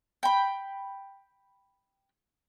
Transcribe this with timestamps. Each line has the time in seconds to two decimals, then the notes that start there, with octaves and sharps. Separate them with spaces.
0.23 G5 B5